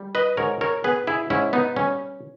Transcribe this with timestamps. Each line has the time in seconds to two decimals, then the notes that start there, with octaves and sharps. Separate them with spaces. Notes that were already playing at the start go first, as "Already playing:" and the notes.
Already playing: G3
0.15 B4 D#5
0.37 G#2 A#4 C#5
0.61 A#4 C#5
0.84 B3 G#4 B4
1.07 E4 G#4
1.30 G#2 C#4 E4
1.53 B3 D#4
1.76 G3 C#4